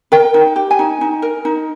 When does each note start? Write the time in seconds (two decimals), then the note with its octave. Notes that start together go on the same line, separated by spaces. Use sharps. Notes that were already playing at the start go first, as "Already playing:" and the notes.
0.12 A#4 G5
0.34 D#4
0.56 G4
0.71 G#5
0.79 D#4
1.01 D#4
1.22 A#4
1.45 D#4